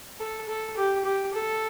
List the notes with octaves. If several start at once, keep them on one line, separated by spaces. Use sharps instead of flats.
A4
A4
G4
G4
A4